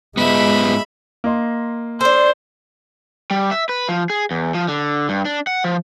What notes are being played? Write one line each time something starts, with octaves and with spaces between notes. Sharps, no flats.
G#2 G#3 B3 E5 B5
A#3 D#5 C6
D4 A4 C5
G3
E5
B4
F3
G#4
E2
F3
D3
G2
D4
F#5
F3